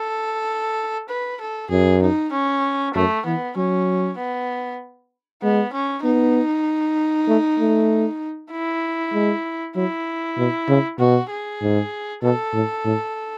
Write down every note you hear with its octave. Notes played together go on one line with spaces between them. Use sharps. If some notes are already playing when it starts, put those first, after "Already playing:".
Already playing: A4
B4
A4
F#2 G#4
D#4
C#4
F#2 A3
E3 B3
F#3 C#4
B3
G#3 B3
C#4
B3 D#4
A3
A3
E4
G#3
F#3 E4
B2
C#3
B2 F#4
G#4
G#2
B2 A4
A2
A2